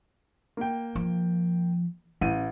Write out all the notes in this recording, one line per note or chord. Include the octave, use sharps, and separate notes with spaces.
A#3 G5
F3
A1 C#4 D#7